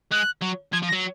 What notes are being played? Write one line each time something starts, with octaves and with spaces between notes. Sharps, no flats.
G#3 F#6
F#3
F3 G#6
F3
A#6
F#3